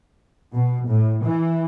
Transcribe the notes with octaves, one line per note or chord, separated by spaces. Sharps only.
B2
A2
E3